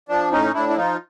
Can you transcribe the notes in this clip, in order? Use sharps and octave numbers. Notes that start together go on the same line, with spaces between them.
F3 D4
A2 C#4 D#4
A2 D4 E4
E4
F3 D#4 F4